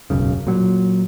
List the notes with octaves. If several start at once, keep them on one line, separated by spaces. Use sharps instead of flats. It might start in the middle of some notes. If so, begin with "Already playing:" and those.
E1 B1 F#2 C#3
A#2 F#3